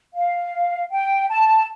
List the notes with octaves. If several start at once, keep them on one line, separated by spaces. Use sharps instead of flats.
F5
G5
A5